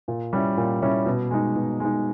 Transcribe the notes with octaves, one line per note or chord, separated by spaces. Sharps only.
A#2
G3 C#4 E4
A#2
G3 C#4 E4
B2
G#3 D#4
B2
G#3 D#4